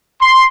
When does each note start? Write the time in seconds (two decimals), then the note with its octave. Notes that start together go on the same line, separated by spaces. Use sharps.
0.20 C6